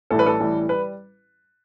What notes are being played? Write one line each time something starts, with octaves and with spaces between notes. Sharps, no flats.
A1 A2 E3 G3 A4
B4
A4
A1 A2 E3 G3
G3 B4